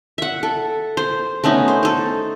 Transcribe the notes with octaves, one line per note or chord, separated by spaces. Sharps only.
E5 F#5
A4
C5
A3 B3 C#4 D#4
C5
D#4 A4